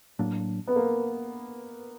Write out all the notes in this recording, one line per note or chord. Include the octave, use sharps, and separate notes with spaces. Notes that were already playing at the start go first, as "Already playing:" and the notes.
A2 F#3 A#3 D4
B3
A#3